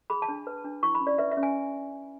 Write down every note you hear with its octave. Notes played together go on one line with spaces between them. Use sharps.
G#4 B5
A5
D4
B4
D4
E4 C#6
B5
C#4
D5
B4 E5
E5
C#4
G#5